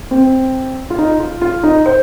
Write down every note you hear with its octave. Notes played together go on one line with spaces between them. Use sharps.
C4
F4
D#4
F4
F4
D#4
C5